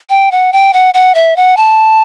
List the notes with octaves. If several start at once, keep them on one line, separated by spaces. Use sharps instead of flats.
G5
F#5
G5
F#5
F#5
E5
F#5
A5